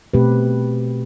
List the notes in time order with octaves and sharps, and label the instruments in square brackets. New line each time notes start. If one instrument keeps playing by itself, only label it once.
[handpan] B2 A3 C4 G4 B4